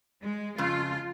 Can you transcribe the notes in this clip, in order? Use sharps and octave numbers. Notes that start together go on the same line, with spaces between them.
G#3
F2 C#3 F4